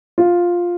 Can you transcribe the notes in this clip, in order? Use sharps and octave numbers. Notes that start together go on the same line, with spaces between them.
F4